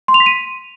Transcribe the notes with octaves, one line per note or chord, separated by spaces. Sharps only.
C6
F7
B6
D#7